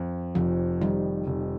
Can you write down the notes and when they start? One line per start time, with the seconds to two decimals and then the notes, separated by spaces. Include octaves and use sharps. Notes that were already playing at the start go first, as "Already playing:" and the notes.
Already playing: F2
0.35 F1 F3
0.81 D#3 G3
1.27 F1